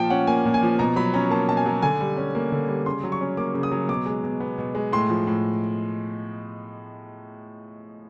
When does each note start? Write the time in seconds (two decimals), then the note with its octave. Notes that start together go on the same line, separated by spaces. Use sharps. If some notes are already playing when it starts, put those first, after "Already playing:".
Already playing: A#2 F3 G5 A5
0.10 C#4 F#5
0.27 A#3 G#5
0.45 A#2
0.54 G#5
0.63 F3
0.79 B2 A#5
0.96 F#3 B5
1.14 C#4 A#5
1.31 A#3 A5
1.48 B2 A5
1.57 G#5
1.66 F#3
1.82 D3 G#5
2.01 G3
2.17 C#4
2.35 A#3
2.52 D3
2.68 G3
2.86 C#3 C6
3.04 F#3
3.12 C#6
3.21 C#4
3.37 A#3 D6
3.54 C#3
3.63 D#6
3.71 F#3
3.89 B2 D6
4.06 G#3
4.24 B2
4.40 B3
4.58 B2
4.75 G#3
4.92 A2 C6
5.09 F3
5.27 A2